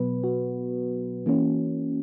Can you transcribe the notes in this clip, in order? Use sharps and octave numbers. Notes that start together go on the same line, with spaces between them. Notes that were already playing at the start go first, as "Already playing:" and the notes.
Already playing: B2 F#3 B3 B4
F#4
E3 A#3 C#4